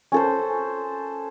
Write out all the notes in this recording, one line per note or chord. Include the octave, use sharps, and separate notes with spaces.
C#4 A4 C5